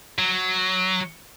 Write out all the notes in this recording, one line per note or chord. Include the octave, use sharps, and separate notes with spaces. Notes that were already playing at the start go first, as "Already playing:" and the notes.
F#3